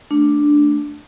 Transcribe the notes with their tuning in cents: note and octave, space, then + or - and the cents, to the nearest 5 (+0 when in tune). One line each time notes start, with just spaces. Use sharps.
A3 +0 D4 +0